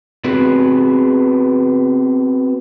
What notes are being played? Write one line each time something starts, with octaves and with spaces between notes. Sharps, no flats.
B3 C4 F#4 G#4 B4